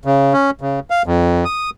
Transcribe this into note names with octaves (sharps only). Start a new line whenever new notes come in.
C#3
C#4
C#3
F5
F2
D#6